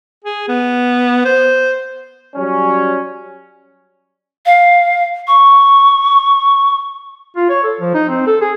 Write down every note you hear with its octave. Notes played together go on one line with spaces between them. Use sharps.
G#4
B3
C5
F#3 G3 C#4
F5
C#6
F4
C#5
A4
F3
D#4
C4
A4
G#4